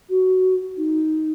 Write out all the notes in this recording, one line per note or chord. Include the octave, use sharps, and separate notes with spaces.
F#4
D#4